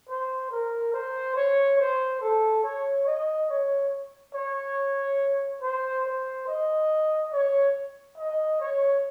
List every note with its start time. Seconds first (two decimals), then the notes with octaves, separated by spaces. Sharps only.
0.09 C5
0.51 A#4
0.94 C5
1.36 C#5
1.79 C5
2.21 A4
2.63 C#5
3.06 D#5
3.49 C#5
4.34 C#5
5.62 C5
6.05 C5
6.48 D#5
7.33 C#5
8.18 D#5
8.60 C#5